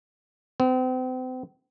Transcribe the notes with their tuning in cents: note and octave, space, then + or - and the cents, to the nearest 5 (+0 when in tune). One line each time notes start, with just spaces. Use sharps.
C4 -40